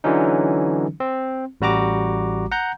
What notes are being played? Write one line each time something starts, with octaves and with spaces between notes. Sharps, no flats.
D3 E3 F#3 C#4 D#4
C4
A1 G3 F#4 A#5 D6
F#5 A#5 G6